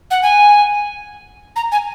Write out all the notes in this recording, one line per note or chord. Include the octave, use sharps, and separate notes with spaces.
F#5
G#5
A#5
G#5